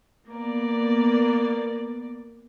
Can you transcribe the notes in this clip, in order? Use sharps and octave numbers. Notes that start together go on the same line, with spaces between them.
A#3 B3 D5